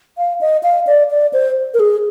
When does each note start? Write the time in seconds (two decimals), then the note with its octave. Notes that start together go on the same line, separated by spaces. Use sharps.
0.18 F5
0.41 D#5
0.63 F5
0.87 D5
1.11 D5
1.33 C5
1.74 A#4
1.80 G#4